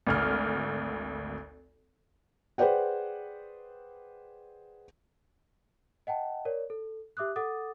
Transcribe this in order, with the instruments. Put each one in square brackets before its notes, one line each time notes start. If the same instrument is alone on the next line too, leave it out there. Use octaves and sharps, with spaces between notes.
[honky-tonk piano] G#1 D2 F6
[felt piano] G#4 B4 C5 D5 F#5 G5
[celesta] D#5 F#5 G5 A5
A#4 C#5 D5
A4
G4 E5 D6 D#6 F#6
A4 F#5 D6 D#6 A6